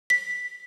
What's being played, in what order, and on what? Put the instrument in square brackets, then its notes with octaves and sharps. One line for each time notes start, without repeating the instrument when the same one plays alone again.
[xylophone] B6